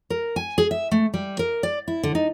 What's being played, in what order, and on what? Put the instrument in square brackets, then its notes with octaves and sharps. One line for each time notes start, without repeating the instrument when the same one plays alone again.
[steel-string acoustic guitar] A#4
G#5
G#4
E5
A3
G3
A#4
D5
E4
D3
D#4